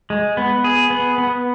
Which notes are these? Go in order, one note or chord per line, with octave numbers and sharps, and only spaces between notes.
G#3
B3
G#4
B3
B3